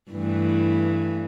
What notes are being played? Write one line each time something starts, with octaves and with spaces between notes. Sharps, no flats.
G2 E3 A3